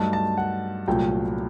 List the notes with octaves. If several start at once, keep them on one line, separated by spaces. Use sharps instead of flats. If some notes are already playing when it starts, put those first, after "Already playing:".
Already playing: G2 F#3 A3 D#4 A5
A5
F#5
C2 A#2 F#3 A3 G5